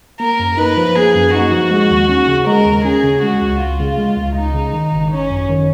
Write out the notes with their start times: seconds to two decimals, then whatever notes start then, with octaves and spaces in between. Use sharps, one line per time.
0.20 A#3 A#4
0.39 F#2
0.58 D#4 B4
0.77 F3
0.95 A#3 G#4
1.15 F#2
1.34 D#4 F#4
1.52 F3
1.71 G#3
1.91 D#2
2.09 C#4
2.28 C#3
2.47 G#3 A#4
2.66 D#2
2.85 C#4 G#4
3.03 C#3
3.22 G#3 F#4
3.42 C#2
3.60 C#2 F4
3.80 C#3
3.98 G#3
4.17 C#2
4.35 C#2 D#4
4.55 C#3
4.74 D#3
4.92 G#1
5.11 G#1 C#4
5.30 F#2
5.49 D#3